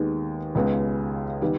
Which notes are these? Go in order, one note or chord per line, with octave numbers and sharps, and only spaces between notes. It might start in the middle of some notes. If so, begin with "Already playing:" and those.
Already playing: D#2 D#3 G#3 B3
C#2 C#3 G#3 B3
D#3 G3 B3